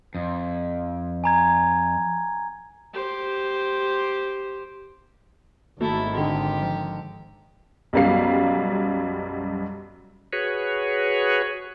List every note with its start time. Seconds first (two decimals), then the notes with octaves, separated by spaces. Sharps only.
0.15 F2
1.24 G#5 A#5 G#6
2.94 G4 C5
5.81 G#1 D#3 A3 E4 F#4 A4
6.14 D3 D#4 G4 C6
6.62 F3
7.93 B1 F#2 G3 F5 C7
10.33 F#4 G#4 B4 C#5